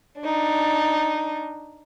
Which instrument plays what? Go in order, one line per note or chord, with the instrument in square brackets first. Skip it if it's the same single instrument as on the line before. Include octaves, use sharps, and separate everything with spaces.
[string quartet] D4 D#4